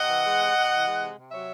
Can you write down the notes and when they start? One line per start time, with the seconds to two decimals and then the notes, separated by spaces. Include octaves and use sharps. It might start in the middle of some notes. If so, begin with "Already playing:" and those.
Already playing: C3 D#5 F#5
0.09 E3
0.25 G#3
0.39 C3
0.55 C3
0.71 E3
0.86 G#3
1.00 C3
1.17 C3
1.32 F#3 C#5 E5